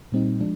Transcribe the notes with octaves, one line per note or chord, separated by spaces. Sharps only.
A#2 G3 C4 D#4
F3 G#3 D4